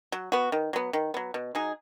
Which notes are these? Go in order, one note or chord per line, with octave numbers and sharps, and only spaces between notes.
F#3
B3 F#4
D#3
F#3 B3
D#3
F#3 B3
B2
F#3 D#4 G#4